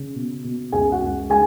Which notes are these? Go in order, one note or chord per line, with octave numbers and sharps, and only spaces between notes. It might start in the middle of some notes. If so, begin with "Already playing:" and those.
Already playing: C#3
B2
B2
C#2 G#4 G#5
F#4 F#5
C#2
G#3 G#4 G#5